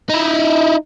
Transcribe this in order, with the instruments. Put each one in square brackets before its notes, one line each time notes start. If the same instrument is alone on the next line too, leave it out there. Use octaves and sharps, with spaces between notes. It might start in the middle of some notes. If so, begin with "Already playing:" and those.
[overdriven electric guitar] D#4 E4